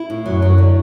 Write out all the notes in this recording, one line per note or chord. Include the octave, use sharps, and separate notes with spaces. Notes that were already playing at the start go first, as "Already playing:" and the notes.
Already playing: E4
A2
F#2 F#3
F#3
D3